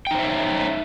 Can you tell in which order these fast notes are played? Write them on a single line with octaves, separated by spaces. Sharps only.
G5 D#4 C5 E5 C#5